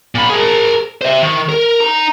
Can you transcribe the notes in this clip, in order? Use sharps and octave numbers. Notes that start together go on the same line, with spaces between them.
A#2 B5
G#4 A#4
C5 E5
D#3
A#4
D#4 A#5